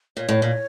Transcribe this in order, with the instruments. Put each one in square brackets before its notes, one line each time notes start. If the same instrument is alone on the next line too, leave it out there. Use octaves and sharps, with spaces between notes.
[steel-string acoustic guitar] A#2 [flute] C#5
[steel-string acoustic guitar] A2
A#2